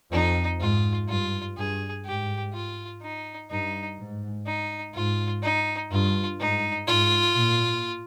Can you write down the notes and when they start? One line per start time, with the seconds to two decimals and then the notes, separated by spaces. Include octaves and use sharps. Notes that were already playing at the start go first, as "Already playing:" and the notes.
0.12 F2 D#4
0.60 G#2 F4
1.09 G2 F4
1.57 G2 G#4
2.05 G#2 G4
2.53 F4
3.02 D#4
3.50 G2 D#4
3.98 G#2
4.46 D#4
4.94 G#2 F4
5.43 D#4
5.91 G2 F4
6.40 G#2 D#4
6.87 G#2 F4
7.36 A#2